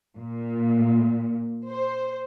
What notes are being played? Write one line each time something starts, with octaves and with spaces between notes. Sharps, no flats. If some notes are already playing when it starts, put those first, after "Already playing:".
A#2
C5